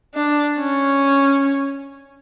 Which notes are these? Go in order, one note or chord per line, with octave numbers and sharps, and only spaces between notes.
D4
C#4